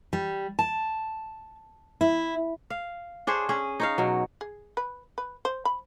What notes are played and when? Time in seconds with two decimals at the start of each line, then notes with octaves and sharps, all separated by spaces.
0.13 G3
0.59 A5
2.01 E4
2.70 F5
3.27 D4 G#4 C5 C#5
3.49 C#4 G#4
3.80 D#4 C#5 F5
3.98 B2 F#3
4.41 G#4
4.77 B4
5.18 B4
5.45 C5
5.65 B5